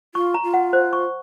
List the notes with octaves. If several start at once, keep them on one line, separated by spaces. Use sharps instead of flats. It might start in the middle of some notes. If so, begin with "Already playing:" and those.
F4 C#6
A#5
F4
F#5
C5
C#6